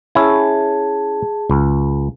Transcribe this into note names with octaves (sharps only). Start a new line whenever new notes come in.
C#4 E4 G#4 A5
C#2